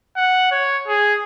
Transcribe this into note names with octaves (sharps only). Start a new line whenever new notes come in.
F#5
C#5
G#4